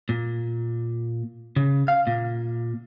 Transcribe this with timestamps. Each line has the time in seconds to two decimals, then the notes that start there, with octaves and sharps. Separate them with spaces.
0.09 A#2
1.56 C#3
1.88 F5
2.07 A#2